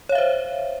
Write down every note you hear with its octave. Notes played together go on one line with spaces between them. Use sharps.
C5 C#5 E5 F5